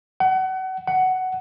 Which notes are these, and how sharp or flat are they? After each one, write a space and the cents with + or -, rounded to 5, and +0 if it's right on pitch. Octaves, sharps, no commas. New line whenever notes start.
F#5 +30
F#5 +10